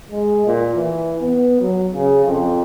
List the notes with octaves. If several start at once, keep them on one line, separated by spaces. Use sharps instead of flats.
G#3
A#2
E3
B3
F#3
C#3
F2